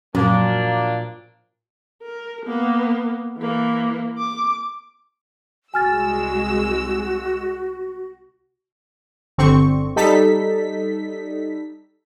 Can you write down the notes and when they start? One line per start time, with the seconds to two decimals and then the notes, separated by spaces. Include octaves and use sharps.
0.15 F#2 A#2 F3 F#3 A#3 D4
2.02 A#4
2.46 A#3 B3
3.38 E3 A#3
4.18 D6
5.74 C2 G#3 F#4 G#5 E6 F6 A6
9.38 G1 D3 C4 C#6
9.96 G3 D#4 A4 B6